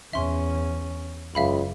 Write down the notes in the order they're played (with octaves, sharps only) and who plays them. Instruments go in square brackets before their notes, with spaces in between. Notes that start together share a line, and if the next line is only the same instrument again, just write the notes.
[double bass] E2 C#4 [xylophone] E5 C6
[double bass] F#1 [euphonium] C#2 [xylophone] E5 F5 B5